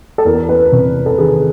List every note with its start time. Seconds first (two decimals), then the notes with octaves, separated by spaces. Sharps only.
0.18 A4
0.25 E2 A#4
0.49 B4
0.72 C3
1.06 A4
1.18 D#3 G#4